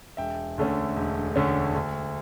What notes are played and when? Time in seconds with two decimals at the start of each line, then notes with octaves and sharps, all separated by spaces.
0.17 E1 E5 G5
0.58 D2 D3 A3 C#4
0.96 E1
1.36 D2 D3 A3 C#4
1.74 D2